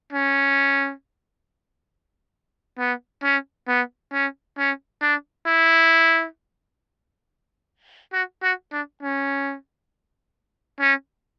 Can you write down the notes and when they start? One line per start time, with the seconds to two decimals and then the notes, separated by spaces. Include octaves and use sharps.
0.12 C#4
2.79 B3
3.23 C#4
3.68 B3
4.13 C#4
4.58 C#4
5.01 D4
5.46 E4
8.13 F#4
8.43 F#4
8.72 D4
9.02 C#4
10.80 C#4